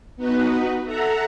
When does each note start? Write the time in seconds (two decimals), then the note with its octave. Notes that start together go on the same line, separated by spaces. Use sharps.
0.16 B3 D#4 F#4 B4
0.85 A4 E5 F#5 A#5